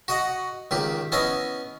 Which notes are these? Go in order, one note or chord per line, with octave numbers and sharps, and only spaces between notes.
F#4 D#5 F#5
C#2 D#3 G4
B3 C#4 E4 D#5